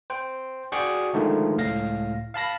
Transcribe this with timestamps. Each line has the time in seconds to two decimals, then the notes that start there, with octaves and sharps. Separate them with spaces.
0.10 C5 G5
0.72 F#4 G#4 D5 G5 C#6
1.13 D3 D#3 F3 G#3 A3 D#4
1.57 C#2 A2 F5 A#6
2.34 F5 A5 B5 A#6